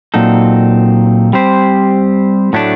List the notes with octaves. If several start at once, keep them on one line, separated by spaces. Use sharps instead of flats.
A#2 F#3 C4 D#4 A4
G3 C4 G4 C5
A2 F#3 A3 D4